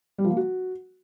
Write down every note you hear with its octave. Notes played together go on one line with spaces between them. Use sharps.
G3
F3
A#3
F#4